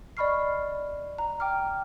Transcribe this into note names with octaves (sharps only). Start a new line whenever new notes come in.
D5 D#5 B5 C#6 F6 C7
A#5
G5 D6 F6